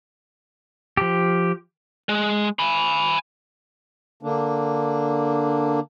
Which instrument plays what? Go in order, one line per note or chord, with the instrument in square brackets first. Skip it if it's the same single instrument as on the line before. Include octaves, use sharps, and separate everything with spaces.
[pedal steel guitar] F3 G4
[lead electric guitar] G#3
G#5 B5
[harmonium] D3 A#3 D4